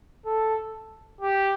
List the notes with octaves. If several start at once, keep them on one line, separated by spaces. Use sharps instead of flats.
A4
G4